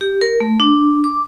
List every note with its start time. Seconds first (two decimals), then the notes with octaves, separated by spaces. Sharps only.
0.01 G4
0.21 A#4
0.40 A3
0.60 D4
1.04 D6